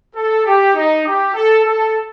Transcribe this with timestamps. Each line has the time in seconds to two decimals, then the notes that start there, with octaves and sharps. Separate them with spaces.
0.15 A4
0.45 G4
0.74 D#4
1.05 G4
1.33 A4
1.64 A4